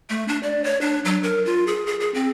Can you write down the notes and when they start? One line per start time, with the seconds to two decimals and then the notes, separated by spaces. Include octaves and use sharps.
0.10 A3
0.28 D4
0.43 D5
0.64 C#5
0.81 D4
1.05 F#3
1.23 A#4
1.46 F4
1.67 G#4
1.87 G#4
2.00 G#4
2.14 C4